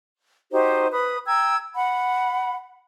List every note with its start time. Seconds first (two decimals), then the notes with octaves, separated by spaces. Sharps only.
0.51 D#4 F#4 G4 C5
0.92 B4 B5 D#6
1.26 G5 A#5 E6 G#6
1.75 F#5 B5